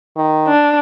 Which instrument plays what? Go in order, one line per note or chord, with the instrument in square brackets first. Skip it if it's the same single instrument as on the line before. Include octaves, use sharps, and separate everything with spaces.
[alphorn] D#3
[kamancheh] D4